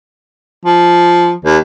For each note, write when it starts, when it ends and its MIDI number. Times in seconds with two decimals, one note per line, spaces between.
0.65 1.33 53
1.45 1.57 39